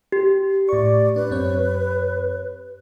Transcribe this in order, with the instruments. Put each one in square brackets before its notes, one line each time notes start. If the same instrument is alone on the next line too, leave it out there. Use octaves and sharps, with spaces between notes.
[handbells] G4
[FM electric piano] A2 C#6 [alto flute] D5
[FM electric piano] D4 [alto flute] B4
[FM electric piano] F#2 C4 C#5